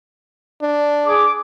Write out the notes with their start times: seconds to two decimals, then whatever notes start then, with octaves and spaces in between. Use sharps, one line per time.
0.62 D4
1.06 G#4 D6